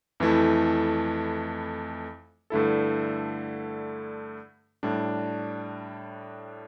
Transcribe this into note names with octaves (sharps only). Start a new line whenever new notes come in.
F2 E3 A3 E4
G2 D3 A3 E4 A4
A2 G3 D4